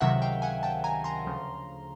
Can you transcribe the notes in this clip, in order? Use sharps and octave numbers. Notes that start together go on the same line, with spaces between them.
C#2 C3 D#3 F#3 E5 F#5
F5 G5
F#5 G#5
G5 A5
G#5 A#5
A#5 C6
D2 C#3 F3